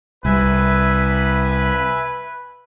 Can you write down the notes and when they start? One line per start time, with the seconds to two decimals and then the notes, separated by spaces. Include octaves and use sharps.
0.25 C2 B4 E5 G#5